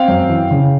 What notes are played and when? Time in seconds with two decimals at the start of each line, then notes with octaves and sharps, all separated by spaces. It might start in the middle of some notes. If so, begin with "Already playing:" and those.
Already playing: C4 F5 G5
0.08 F#2
0.29 E3
0.51 C#3